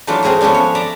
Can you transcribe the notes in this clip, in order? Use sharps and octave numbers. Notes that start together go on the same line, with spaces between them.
E3 F#3 A3 D4 F4
A3 C4 G#4 A#4 A#5
F3 A3 B3 C#4 D4
C#5
D5 E5 A#5